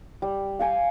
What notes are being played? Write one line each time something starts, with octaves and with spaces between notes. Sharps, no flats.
G3
F5 G5 G#5